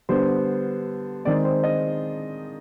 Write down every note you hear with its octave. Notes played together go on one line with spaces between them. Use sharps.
D3 G3 B3 C5
D#3 G#3 C4 D5
C5
D#5